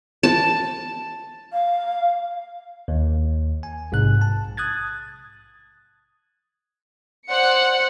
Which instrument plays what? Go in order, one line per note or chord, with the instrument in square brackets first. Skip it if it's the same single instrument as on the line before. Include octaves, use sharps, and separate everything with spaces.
[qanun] A5
[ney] F5
[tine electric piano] D#2
G#5
A#1 G#2 C3 F#6
A5
D#6 F#6 G#6 A6
[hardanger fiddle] C5 D5 [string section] F#5 C#7